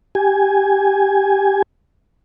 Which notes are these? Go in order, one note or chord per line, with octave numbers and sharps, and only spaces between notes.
G4 G#5